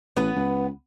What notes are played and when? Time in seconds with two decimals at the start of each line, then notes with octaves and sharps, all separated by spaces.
0.17 A1 B3 B4
0.36 C#2